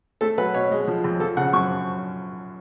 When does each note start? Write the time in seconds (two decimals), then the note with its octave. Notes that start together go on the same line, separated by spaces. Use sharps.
0.21 A3 A4
0.38 F#3 B4
0.54 B2 C#5
0.71 G#3
0.88 F3
1.04 F2
1.20 F3 A4
1.37 C#3 F#5
1.53 F#2 C#6